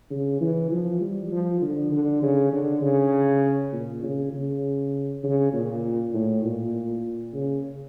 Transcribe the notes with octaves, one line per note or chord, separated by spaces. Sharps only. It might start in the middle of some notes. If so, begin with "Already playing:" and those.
C#3
E3
F3
G3
F3
D3
D3
C#3
D3
C#3
A#2
C#3
C#3
C#3
A#2
A2
A#2
C#3